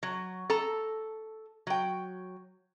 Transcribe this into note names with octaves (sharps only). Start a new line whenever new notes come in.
F#3
A4 A#5
F#3 G5